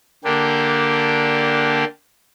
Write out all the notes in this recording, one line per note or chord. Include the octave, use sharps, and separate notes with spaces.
D3 A#3 D4 G4